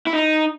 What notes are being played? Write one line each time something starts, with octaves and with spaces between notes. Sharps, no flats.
E4
D#4